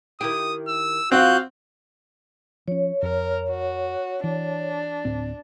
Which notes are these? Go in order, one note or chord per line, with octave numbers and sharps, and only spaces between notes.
D#3 E4 G4 D#6
E6
F3 C4 F4 F#4 F5 F#6 G6
F3 C#4 C#5
F2 A#4
F#4
E3 D4
D1 A2 C4